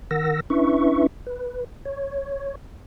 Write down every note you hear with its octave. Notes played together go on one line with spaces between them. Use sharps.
D#3 A#4 F#5 E6 A#6
C#4 D4 E4 B4 E5 C#6
B4
C#5